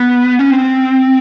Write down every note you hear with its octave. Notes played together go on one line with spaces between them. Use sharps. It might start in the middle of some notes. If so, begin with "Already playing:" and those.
Already playing: B3
C#4
C4